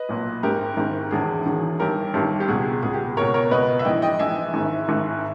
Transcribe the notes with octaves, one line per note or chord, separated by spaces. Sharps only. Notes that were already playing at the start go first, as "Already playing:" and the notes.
Already playing: B4 D#5
B1 A#2
G#1 G#2 D#3 G4 A#4
G#1 G#2 D#3
E1 E2 D#3 G#4
E1 E2 D#3
G1 G2 D#3 G4 A#4
G1 G2 D#3 G4
G4
C#2 B2 G#4
C#2 B2 G#4
G4
C#2 B2 A#4 C#5
A#4 C#5
C#2 B2 B4 D#5
E5
A#1 G#2 E3 D#5 G5
D#5 G5
A#1 G#2 E3 E5 G#5
G#1 G#2 D#3
G#1 G#2 D#3